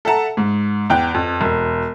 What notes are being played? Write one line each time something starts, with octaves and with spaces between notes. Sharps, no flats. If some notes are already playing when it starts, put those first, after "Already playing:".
A4 E5 F#5 A5 A#5
G#2
E2 G5 F#6
F2
E1